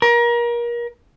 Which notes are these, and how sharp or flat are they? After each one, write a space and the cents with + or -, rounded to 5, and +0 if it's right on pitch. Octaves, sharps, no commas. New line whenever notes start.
A#4 +30